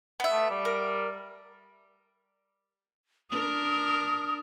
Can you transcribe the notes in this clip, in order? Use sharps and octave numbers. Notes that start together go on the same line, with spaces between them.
B3 E5
A3
G3
A#4
D4 A#4 D#6